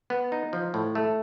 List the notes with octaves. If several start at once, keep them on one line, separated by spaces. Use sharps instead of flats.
B3
D#4
F3
A2
A3